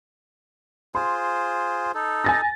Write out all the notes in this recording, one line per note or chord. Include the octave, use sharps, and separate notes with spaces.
F4 G#4 C5 C6
D#4 A4
G#5 A6 A#6